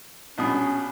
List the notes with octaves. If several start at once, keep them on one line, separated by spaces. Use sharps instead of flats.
A#1 B2 C#4 D#6